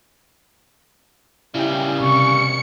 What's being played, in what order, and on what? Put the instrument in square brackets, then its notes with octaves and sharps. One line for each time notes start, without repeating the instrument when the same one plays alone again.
[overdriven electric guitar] C#3 G3 [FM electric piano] E4 E5 G5
[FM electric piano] C3 [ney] C#6 [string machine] C#7